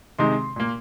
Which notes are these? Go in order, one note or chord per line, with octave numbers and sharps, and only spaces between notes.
C3 D#3 G#3 C6
A#2 A#3